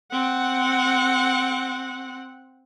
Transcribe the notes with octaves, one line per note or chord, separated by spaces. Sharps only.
C4 F#5